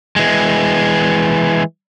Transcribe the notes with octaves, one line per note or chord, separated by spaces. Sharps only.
E3 G#3